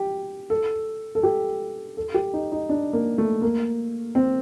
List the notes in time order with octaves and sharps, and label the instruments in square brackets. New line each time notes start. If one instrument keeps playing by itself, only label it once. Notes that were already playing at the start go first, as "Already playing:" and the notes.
Already playing: [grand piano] G4
A4
A4
G4
A4
G4
D#4
D#4
D4
A#3
A3
A#3
C4